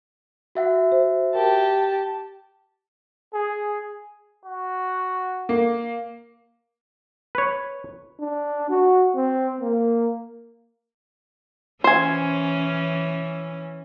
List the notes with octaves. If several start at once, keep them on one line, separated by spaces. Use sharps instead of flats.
F#4 E5 F#5
C5
G4 A#4 A5
G#4
F#4
A#3
B4 C#5
D4
F#4
C4
A#3
E3 C#4 C5 G#5